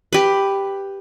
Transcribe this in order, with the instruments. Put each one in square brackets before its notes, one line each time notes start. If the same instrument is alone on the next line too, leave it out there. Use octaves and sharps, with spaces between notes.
[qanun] G4 B4